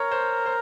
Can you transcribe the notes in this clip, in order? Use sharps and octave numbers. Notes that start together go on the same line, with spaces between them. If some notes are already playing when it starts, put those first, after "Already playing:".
Already playing: A#4 C#5
C5
C5